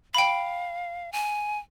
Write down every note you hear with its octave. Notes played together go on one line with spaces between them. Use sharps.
F5 G5 B5
G#5